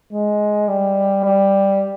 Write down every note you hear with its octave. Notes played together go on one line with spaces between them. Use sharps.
G#3
G3
G3